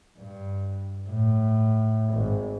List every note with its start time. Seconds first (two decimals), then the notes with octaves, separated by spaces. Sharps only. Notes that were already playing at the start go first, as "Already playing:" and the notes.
0.19 G2
1.09 A2
2.13 G#1